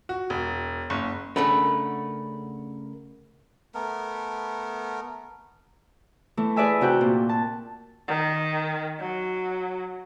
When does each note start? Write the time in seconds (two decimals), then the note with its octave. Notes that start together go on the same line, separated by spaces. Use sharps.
0.09 F#4
0.30 E1
0.90 F#1
1.36 C#3 A3 D4 A#4 F#5 B5
3.74 A3 B3 A#4
6.37 E3 A3
6.56 G#4 B4 D5 E5 G#5
6.81 C3 F#4 G5 F#6
7.01 A#2
7.29 A5
8.08 D#3
9.00 F#3